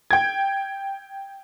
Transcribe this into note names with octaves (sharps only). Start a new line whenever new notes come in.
G5 G#6